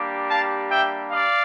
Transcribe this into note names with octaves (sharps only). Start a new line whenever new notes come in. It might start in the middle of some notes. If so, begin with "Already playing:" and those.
Already playing: G3 A#3 D4 G4
F5 A5
E5 G5
D5 F5